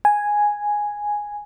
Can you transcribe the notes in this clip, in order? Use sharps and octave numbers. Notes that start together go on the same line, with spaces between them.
G#5